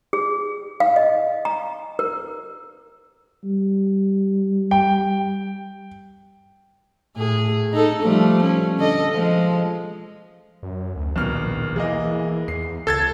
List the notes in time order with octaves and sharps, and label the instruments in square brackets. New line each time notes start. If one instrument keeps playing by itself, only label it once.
[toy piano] G#4
F5
D#5
A#5
A#4
[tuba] G3
[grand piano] G5
[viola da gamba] A2 G#4
D#4 A4
F3 G3 A3
C#4
D3 A4 D#5
F3 G#3
[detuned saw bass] F#2
D2
[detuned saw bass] A#1 [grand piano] D#2 B2 F6
[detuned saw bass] E3 [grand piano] G#3 A#3 D#5
[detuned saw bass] E2 [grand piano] C7
[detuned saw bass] C#2 [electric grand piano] A4 G#6 A6